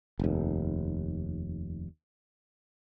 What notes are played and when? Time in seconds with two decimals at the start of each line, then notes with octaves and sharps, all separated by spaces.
0.19 F1 D#2